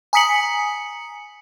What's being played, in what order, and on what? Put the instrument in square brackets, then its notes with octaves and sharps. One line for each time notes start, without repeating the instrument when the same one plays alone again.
[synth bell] G#5 A#5 D#6 B6 C#7 F#7